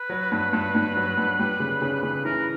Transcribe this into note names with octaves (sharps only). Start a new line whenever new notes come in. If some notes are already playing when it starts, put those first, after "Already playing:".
Already playing: B4
F#3
G2
G2
G2
F#3
G2
G3
C#3
C#3
C#3 B4
E3 A#4